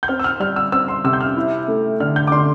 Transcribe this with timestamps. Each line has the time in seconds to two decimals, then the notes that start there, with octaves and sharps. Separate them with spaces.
0.03 G6
0.08 C4 F6
0.19 E6
0.24 F6
0.40 G3 F6
0.56 E6
0.72 C4 E6
0.88 C6
1.04 C3 E6
1.13 G6
1.21 F6
1.37 E4
1.68 A3
2.00 D3 F6
2.16 G6
2.27 D6
2.32 D3 C6